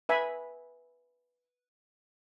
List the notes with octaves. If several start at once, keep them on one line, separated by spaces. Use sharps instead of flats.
B4 E5 G#5 B5